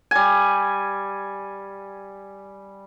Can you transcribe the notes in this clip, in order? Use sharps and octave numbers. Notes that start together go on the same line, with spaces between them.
G3 G#5